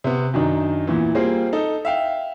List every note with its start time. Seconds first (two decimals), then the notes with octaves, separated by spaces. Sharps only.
0.04 C3 B3
0.34 F#2 D#3 D4 D#4
0.87 E2 A#2 E3
1.15 G3 A#3 C4 F4 G#4
1.53 D#4 A4
1.85 E5 F5 G5